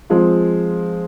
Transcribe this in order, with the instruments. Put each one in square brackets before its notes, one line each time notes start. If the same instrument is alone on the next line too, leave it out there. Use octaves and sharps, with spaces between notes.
[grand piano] F3 G#3 C4 F4